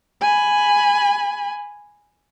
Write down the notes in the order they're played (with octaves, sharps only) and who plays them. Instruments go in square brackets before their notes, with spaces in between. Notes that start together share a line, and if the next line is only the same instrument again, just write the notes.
[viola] G#5 B5